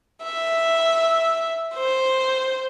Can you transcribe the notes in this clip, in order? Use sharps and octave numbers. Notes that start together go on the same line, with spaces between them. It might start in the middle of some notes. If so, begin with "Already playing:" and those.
E5
C5